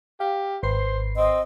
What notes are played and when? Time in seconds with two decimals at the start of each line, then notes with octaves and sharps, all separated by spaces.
0.20 G4 F5
0.63 G#1 B4 C5 C7
1.17 C4 D#5